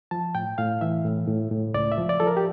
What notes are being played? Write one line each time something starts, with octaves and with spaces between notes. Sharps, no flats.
F3 A5
A2 G5
A2 F5
E3 E5
A2
A2
A2
C#2 D5
E5
F3
D5
F3 A4
A#4
G4